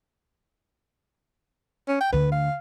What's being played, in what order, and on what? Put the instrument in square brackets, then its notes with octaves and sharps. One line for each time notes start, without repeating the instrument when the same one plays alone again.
[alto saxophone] C#4
G5
[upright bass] D2 D3 [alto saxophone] B4
[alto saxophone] F5